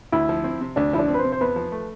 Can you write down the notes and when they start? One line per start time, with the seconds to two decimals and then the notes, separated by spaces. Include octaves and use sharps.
0.12 D2 E4
0.29 F3
0.44 C4
0.61 C3
0.76 D2 D4
0.93 F3 E4
0.99 D4
1.09 C4
1.14 B4
1.19 C5
1.25 C3
1.32 C5
1.41 E2 B4
1.56 F3
1.72 A3